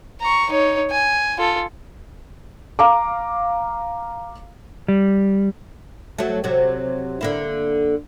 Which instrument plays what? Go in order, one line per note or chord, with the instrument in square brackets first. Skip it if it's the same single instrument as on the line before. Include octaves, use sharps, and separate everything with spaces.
[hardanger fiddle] A#5 C#6
D#4 C#5
G#5
F4 A4
[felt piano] F5 A#5 D6
[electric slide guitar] G3
[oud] F#3 A3
C3 F#3
D3 A#3 E4